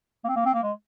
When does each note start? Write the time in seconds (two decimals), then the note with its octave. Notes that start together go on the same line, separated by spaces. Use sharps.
0.24 A#3
0.28 C4
0.36 A#3
0.46 C4
0.54 A#3
0.63 G#3